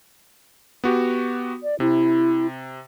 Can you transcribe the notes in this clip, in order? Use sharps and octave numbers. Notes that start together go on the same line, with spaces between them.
B3 F#4 G4
D5
C3 E4